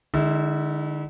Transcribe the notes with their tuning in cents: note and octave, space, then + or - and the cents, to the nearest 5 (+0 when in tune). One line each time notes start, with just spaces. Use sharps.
D3 +35 G#3 +0 E4 -30